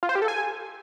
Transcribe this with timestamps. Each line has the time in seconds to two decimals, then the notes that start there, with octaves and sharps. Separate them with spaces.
0.03 F4
0.09 C5
0.15 G4
0.22 A4
0.28 G#5